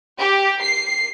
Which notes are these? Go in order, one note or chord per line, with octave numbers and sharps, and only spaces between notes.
G4
C7